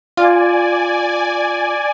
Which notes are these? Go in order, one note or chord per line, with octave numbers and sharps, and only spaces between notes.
F4 D5 G#5